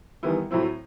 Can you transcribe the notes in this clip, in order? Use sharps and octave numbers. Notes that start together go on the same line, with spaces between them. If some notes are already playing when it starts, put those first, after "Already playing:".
E2 D#3 G3 B3 E4
A2 F#3 C4 E4